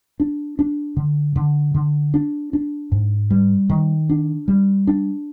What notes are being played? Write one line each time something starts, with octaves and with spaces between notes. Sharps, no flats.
D4
D4
D3
D3
D3
D4
D4
G#2
G3
D#3
D4
G3
D4